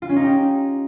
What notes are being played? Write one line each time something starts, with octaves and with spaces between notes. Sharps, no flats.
F4
C#4
D#4
G4